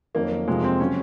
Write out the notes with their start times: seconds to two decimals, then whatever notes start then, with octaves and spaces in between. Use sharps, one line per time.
0.15 F2 D#3 F#3 A#3 C#4
0.47 F2 C3 F3 G#3
0.64 C4
0.80 C#3 F#3 C#4